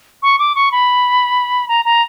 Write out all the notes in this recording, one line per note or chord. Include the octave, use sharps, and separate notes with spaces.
C#6
D6
C#6
B5
A#5
A#5